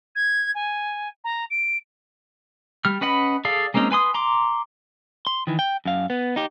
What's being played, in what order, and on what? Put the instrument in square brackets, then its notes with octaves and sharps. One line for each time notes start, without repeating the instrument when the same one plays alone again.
[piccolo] G#6
G#5
A#5
D7
[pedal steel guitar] G3 F6
C#4 B4 D#5 F#5 B5
G#4 A4 D5 F5
G#3 A#3 C4 C#4 D#4
B4 G#5 C6 D#6
A#5 C6 D6
[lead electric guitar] C6
D#3 E3
G5
F#2 F5
B3
D#4 G4